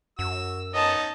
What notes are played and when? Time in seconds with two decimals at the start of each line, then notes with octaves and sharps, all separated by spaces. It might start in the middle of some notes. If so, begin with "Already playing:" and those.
0.19 F#2 F#4 E6
0.74 B3 C#4 D#4 D#5 A5